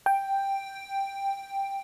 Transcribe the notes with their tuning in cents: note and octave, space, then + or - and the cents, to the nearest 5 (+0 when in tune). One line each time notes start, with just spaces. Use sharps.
G5 +5